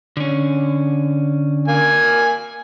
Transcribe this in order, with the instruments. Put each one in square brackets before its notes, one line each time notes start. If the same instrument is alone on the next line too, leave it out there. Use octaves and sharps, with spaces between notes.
[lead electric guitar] D3 C#4
[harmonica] A#3 G#5